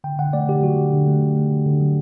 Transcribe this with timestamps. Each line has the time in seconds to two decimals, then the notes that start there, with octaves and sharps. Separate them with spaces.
0.04 D3 G5
0.19 D3 F#5
0.33 A3 D5
0.48 D3 G4
0.62 F#3 F#4
0.78 D3
0.93 D3
1.07 A3
1.22 D3
1.36 A3
1.51 D3
1.65 D3
1.80 F#3